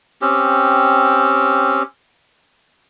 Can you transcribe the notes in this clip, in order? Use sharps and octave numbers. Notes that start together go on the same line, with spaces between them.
C4 C#4 G4